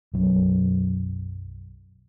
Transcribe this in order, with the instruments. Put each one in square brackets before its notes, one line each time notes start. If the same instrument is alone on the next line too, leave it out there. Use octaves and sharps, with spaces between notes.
[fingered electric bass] B1 F#2